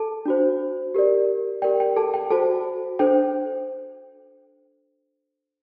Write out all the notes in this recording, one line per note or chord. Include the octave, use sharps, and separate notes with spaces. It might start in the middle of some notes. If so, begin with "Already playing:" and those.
Already playing: A4 A5
D4 F#4 C5
G4 A#4 D5
G4 A#4 D5 G5
G5
A4 A5
G5
F#4 A4 C5 A5
D4 A4 C5 G5